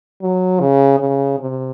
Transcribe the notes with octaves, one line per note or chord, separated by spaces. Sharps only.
F#3
C#3
C#3
C3